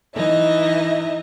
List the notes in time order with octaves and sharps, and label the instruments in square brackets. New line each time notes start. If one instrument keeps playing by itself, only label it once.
[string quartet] E3 D#4 D#5 E5